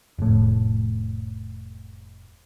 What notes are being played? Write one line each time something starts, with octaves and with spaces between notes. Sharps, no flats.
F1 A2